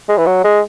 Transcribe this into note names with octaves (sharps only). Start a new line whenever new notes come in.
G#3
E3
F#3
G#3